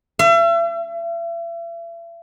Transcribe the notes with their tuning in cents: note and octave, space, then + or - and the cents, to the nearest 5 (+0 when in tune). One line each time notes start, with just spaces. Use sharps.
E5 +40